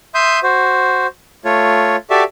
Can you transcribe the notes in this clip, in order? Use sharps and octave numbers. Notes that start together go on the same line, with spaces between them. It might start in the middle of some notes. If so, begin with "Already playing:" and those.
E5 C6 D#6 G6
F#4 C5
A3 F4 C#5
F#4 G4 A4 D5 E5